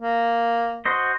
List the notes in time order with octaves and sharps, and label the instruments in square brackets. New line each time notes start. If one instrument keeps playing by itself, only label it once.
[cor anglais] A#3
[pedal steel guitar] F#4 C5 D#5